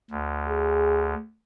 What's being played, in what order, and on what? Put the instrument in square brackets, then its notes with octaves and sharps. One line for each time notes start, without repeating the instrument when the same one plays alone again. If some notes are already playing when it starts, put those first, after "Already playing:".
[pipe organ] D2
[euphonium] G#4